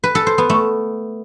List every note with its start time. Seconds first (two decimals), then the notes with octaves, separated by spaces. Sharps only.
0.04 B4
0.15 A4
0.27 C5
0.38 B3
0.50 A3